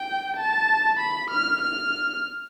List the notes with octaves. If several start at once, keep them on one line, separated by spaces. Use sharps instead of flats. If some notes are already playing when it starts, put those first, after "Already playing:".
Already playing: G5
A5
B5
F6
F6